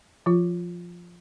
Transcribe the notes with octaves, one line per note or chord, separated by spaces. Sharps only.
F3 F4